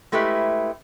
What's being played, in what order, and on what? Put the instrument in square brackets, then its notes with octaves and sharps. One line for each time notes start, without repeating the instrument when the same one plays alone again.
[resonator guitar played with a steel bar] G#3 A3 E4 G4 B4